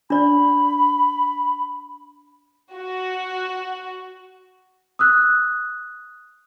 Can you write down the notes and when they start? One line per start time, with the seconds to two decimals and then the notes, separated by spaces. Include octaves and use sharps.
0.10 D4 D5 B5
2.74 F#4
4.99 D#6 E6 F#6